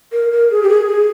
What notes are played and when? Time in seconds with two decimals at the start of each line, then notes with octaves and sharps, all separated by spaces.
0.12 A#4
0.31 A#4
0.51 G#4
0.63 G4
0.70 G#4
0.89 G#4